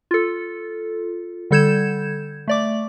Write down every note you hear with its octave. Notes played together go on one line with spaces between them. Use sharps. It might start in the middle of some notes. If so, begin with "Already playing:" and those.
F4 A4
D3 G3 A4 G6 G#6 E7
A3 D5 D6